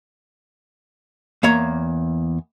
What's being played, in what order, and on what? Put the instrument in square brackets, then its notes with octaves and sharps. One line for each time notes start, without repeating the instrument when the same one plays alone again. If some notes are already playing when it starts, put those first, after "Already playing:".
[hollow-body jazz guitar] E2 A#3 C#5 A#5